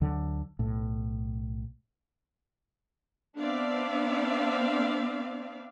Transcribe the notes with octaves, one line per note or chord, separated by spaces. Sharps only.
D2 D3 F#3
B1 A2
B3 C4 D4 D5 E5 F5